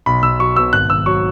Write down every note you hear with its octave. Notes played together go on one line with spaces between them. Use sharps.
B1 B5
B1 E6
F#3 C#6
B2 E6
G#1 F#6
G#1 E6
F#3 C#6